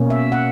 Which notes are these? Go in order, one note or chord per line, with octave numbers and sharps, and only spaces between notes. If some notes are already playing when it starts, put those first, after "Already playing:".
Already playing: B2 A#3 C#4
E5
F#5